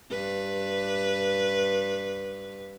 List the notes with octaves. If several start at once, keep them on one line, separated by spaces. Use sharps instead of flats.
G2 B4